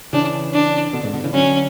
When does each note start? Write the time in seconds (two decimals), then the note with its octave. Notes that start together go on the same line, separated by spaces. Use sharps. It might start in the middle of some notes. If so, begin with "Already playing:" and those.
0.13 C#3 E3 D4
0.54 D4
0.93 B2 D3
1.03 G#2 B2
1.14 B2 D3
1.24 C#3 E3
1.34 D3 F#3 C#4